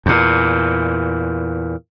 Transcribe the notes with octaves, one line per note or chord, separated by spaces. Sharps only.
E2 A#2